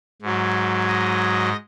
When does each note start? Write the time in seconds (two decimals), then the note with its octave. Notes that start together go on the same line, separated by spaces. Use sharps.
0.22 G#2 F#3
0.88 D#5